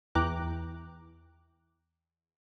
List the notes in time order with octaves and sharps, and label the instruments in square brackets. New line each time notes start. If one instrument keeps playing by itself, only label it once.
[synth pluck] E2 E3 G5 A#5 D6 F#6